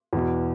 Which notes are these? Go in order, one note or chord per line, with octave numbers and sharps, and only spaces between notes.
E2 B2